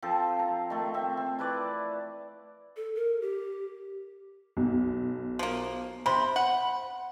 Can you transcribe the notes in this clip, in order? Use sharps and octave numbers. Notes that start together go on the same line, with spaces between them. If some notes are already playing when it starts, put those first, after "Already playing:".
F3 C4 A4 C5
A#5
D#3 A3
C4 E5
C4
E4 B4 D5
A4
A#4
G4
B1
F3 A#3
C3 C5 B5
F#5